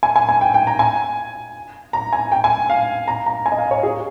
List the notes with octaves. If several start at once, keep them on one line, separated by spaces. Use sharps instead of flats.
G#5
G#5
G#5
G5
G5
A#5
G#5
A#5
G#5
G5
G#5
F5
A#5
A#5
G#5
D#5
F5
C#5
G#4